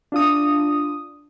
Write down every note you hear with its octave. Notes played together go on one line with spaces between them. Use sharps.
D4 F4 D#6